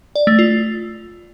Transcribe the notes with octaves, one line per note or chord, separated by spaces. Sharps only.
D5
A3
F4